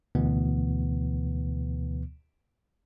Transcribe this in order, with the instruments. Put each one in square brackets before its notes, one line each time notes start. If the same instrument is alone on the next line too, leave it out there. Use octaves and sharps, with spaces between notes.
[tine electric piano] D2 B2 E3 B3